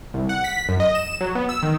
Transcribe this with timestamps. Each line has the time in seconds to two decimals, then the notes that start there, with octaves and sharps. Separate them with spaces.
0.14 C2
0.29 F#5
0.44 B6
0.69 F#2
0.80 D#5
0.95 E7
1.21 F#3
1.35 B3
1.49 E6
1.63 D#3